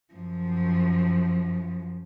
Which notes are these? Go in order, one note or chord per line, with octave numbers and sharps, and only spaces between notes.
F#2 F3